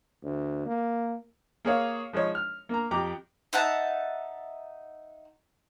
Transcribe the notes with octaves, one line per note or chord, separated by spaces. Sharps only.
D2
A#3
A#3 G#4 C#5 F5
F3 G#3 D#4 C#5
F6
A#3 A#5
F2 G4 A#5 D6
D#4 E5 F#5 A5